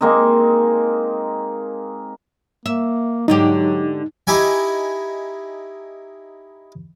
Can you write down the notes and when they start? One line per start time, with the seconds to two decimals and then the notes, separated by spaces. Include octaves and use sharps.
0.01 G#3 A#3 C4 D#4
2.66 A#3 E5
3.28 G#2 D3 F#3 D#4 G4
4.27 D#4 E4 G4 G#5